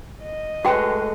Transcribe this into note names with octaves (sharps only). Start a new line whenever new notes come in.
D#5
G#3 A3 F#4 B4 G5